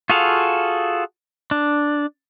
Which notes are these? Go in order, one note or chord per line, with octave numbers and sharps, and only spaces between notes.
F4 F#4 G#4 A4 F5
D4